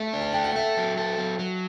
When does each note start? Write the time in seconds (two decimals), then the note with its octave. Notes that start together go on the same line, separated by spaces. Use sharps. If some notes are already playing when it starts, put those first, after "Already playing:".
Already playing: A3 E5
0.13 D4
0.21 A5
0.33 A3 G5
0.44 F#5
0.56 A4 E5
0.77 F#3
0.98 A4
1.18 F#3
1.39 F#3